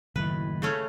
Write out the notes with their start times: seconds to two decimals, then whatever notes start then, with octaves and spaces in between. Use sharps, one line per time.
0.16 F#1 A2 D#3 B4
0.62 C#3 A3 C#4